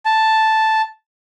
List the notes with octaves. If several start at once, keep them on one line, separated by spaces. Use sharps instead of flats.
A5